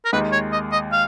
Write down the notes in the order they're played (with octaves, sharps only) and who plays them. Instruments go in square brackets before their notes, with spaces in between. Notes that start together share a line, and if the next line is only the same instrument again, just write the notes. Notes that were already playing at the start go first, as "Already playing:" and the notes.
[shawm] A#4
[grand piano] D#2 D#3 G#3 [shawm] B4
[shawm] C#5
D#5
D#5
F5